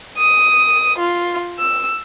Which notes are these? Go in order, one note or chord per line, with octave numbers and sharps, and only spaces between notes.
D#6
F4
E6